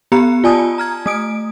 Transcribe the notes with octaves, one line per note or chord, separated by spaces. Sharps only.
B3 G4 A#5 B5 C#7
F4 D5 G#5 A5 D#6
A#5 F6 G#6
A3 D#6 D7